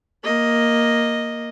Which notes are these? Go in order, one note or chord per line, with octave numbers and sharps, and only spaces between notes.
A#3 D#5